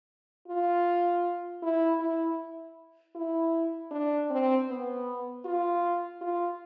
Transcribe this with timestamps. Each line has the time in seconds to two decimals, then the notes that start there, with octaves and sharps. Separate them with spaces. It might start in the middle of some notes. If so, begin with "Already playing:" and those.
0.48 F4
1.62 E4
2.00 E4
3.15 E4
3.91 D4
4.30 C4
4.68 B3
5.45 F4
6.21 F4